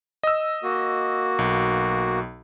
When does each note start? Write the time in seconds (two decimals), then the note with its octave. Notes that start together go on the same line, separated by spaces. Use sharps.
0.23 D#5 E6
0.63 A#3 F#4
1.39 B1